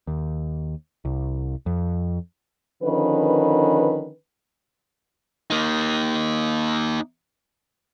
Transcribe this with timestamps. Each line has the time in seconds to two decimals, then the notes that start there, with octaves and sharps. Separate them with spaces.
0.07 D#2
1.05 C2
1.66 F2
2.82 D3 D#3 F3 C#4 B4
5.50 A#3 D#4